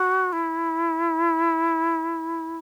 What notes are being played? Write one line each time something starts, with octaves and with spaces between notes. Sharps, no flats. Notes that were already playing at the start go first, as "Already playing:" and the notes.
Already playing: F#4
E4